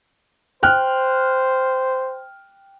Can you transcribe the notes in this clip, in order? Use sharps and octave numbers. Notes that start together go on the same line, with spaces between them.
C5 G5 F6 F#6